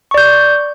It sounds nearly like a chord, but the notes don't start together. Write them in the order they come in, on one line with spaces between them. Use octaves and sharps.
C#6 D5 G6